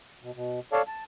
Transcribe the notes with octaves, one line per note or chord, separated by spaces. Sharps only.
B2
B2
A4 C#5 D5 F5 A5
A5